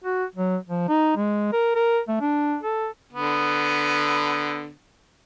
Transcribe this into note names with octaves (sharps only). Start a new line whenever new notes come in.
F#4
F#3
F3
D#4
G#3
A#4
A#4
A3
D4
A4
D3 B3